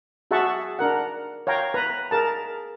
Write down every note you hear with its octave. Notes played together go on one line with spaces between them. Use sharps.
F#4 G#4 E5 F#5 A5 C#6
D4 A#4 F#5
C#5 F5 G5 A#5
B4 A#5
G#4 A#4 A5